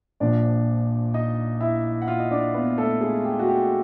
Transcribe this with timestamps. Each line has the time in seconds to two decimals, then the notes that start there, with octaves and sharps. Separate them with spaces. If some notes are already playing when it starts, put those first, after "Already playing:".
0.20 A#1 A#2 F3 D4 D5
1.14 D#4 D#5
1.60 E4 E5
2.02 F#5
2.08 F4 F5
2.20 D#5
2.31 D4 D5
2.54 B3 B4
2.78 A3 A4
3.01 G#3 G#4
3.24 G4
3.39 F#4
3.48 G4